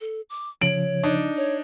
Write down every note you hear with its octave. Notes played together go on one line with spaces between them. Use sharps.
A4
D6
C#3 F3 C#5 D7 F#7
D4 D#4
C#5